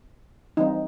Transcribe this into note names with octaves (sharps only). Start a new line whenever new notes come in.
E3 G3 C4 D#4